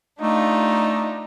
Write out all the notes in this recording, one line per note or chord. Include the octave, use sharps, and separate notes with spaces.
A3 D4 D#4 F4 G4